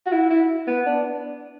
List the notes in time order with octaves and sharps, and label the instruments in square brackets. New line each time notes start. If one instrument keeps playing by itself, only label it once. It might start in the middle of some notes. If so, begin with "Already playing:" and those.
[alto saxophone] F#4
E4
E4
B3
D4